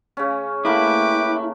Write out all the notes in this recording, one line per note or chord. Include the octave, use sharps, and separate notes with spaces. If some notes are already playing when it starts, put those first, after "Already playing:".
C#3 C#4
A3 A#3 E4 A#4 B4 G5 D6